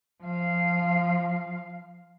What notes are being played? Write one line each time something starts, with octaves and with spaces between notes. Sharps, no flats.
F3 F5